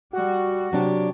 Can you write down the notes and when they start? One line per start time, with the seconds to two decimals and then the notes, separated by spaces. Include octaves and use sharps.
0.13 G3 F#4
0.73 C3 F#3 D4 G4